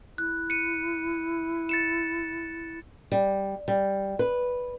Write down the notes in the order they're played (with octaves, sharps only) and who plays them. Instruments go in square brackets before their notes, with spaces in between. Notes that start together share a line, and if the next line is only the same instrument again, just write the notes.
[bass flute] E4 [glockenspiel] F#6
[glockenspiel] C#7 D#7
A6 C#7 E7
[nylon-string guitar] G3
G3
B4